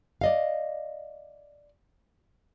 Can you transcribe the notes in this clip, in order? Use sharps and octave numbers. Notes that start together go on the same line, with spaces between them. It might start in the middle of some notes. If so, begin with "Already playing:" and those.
D5 D#5 F5